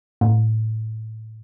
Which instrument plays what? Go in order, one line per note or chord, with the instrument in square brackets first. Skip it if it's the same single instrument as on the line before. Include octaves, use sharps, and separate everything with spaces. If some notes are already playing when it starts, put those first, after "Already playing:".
[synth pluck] A2